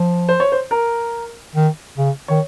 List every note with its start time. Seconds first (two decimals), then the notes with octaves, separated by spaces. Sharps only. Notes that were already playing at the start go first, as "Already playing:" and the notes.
Already playing: F3
0.29 C5
0.40 C#5
0.52 C5
0.71 A#4
1.55 D#3
1.97 C#3
2.28 D#3 C#5